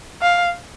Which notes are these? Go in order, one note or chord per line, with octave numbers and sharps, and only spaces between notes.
F5